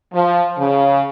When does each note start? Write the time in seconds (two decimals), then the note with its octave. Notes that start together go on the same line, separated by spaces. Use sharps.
0.14 F3
0.59 C#3